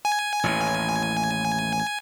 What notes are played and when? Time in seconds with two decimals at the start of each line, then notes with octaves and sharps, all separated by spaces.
0.05 G#5
0.44 A1 D#2 A2